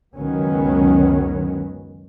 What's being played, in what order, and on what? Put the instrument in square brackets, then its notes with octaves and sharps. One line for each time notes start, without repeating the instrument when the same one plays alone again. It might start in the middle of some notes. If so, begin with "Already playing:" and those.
[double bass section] C#2 F#2 D#3 F#3 B3 C#4